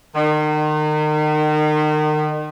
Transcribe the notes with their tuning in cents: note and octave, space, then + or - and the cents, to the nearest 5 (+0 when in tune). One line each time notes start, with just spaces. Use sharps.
D#3 -35